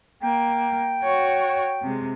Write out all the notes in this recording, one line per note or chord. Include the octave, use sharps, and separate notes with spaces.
A#3 G5
F#4 C#5
C3 G#3